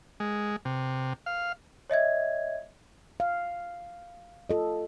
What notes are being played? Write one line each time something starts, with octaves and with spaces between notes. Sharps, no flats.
G#3
C3
F5
C#5 D#5 E5 G#6
F5
F4 A4 D#5